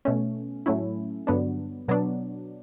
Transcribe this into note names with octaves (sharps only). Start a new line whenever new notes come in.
B2 A3 C#4
A2 F#3 A3 C#4 E4
G2 D3 F#3 B3 D4
B2 F#3 B3 D4